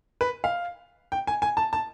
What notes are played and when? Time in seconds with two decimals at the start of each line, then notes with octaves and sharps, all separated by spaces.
0.21 B4
0.44 F5
1.12 G5
1.27 G#5
1.42 G#5
1.57 A5
1.73 A5